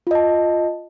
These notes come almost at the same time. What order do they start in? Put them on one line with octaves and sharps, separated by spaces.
F4 D#5 A5